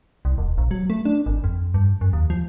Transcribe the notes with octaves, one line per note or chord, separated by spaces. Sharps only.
C2
D#1
A#1
F#3
A3
D4
G#1
F2
G2
F#2
D#2
F3